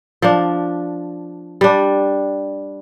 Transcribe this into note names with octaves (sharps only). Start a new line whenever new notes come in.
F3 D4
G3 D4